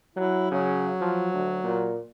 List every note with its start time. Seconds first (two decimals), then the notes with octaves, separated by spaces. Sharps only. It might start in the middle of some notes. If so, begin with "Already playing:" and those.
0.16 F#3 E4
0.51 C#3 F#3
1.01 F3
1.34 D2
1.63 A#2